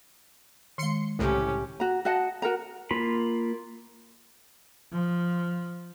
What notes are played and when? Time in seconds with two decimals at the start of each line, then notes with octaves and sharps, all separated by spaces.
0.78 D#3 G#3 C6 C#7
1.19 C2 A2 C#3 C#4 G4
1.80 F#4 A#5
2.05 F#4 D#5 F#5 A5
2.42 F#4 A#4 F#5 A#5
2.91 A#3 F4 B5
4.92 F3